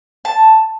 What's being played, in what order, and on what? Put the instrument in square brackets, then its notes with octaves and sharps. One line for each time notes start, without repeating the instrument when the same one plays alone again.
[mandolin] A5